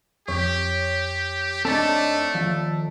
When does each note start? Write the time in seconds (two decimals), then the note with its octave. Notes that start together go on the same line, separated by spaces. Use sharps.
0.28 F2 G4 C#5
1.65 A3 C4 D4 D#4 A4 D5
2.35 D#2 F3